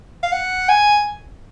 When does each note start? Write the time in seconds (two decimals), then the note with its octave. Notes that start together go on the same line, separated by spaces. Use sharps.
0.23 F5
0.32 F#5
0.69 G#5